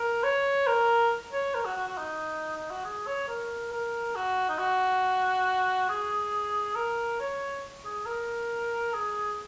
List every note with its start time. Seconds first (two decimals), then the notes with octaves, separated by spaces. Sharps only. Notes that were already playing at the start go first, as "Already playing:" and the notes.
Already playing: A#4
0.24 C#5
0.67 A#4
1.33 C#5
1.55 A#4
1.65 F#4
1.76 F#4
1.87 F#4
1.98 D#4
2.57 D#4
2.71 F#4
2.84 G#4
3.07 C#5
3.28 A#4
3.72 A#4
4.15 F#4
4.49 D#4
4.59 F#4
5.89 G#4
6.76 A#4
7.20 C#5
7.85 G#4
8.06 A#4
8.94 G#4